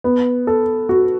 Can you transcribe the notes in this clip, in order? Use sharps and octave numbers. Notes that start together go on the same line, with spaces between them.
B3
A4
F#4